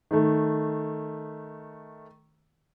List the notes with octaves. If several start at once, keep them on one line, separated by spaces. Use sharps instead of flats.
D#3 A3